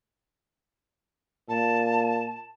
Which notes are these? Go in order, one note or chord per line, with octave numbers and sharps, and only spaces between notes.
A#2 A5